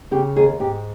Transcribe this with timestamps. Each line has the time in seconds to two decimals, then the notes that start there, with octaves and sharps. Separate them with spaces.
0.11 C#3 G4
0.36 D#2 G#4
0.59 G#2 G4